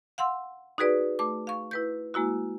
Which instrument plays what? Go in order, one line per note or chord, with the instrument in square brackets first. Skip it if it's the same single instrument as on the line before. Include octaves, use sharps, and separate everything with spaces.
[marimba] F5 F#5 C6 E6
D#4 F#4 G#4 B4 D5
A3 D6
F5 C#6
E4 B4 G6
G#3 A#3 E4 F#4